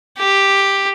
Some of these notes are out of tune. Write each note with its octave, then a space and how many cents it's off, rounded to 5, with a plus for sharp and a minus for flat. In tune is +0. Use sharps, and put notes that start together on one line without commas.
G4 +5